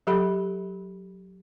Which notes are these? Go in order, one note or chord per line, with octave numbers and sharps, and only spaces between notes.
F#3 G4 A4 B5